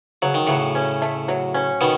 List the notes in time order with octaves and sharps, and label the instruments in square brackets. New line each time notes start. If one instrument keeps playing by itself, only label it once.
[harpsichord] C#3 [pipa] F#3
[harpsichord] D#3
[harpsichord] A2 C#3 [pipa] F#3
[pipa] C#4
A3
F#3
C#4
[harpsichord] B2 D#3 [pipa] B3